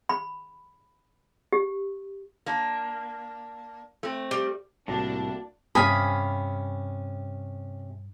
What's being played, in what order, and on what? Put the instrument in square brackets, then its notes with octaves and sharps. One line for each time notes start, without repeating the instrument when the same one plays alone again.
[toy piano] B5
G4
[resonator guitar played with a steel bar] A#3 D4
A3 C4
[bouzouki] G3
[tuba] C2 [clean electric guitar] A2 [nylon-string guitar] A#3 F#4 [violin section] D4
[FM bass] G2 [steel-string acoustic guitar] C3 C#4 [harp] F5 G#5 D#6 [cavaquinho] B5